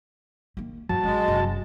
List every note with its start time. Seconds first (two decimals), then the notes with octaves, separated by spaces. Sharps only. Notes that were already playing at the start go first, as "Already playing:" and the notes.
0.57 D#3 A#3
0.89 E2 G2 F#3 A5
1.03 A1 D#3 G#3
1.28 F#1 C3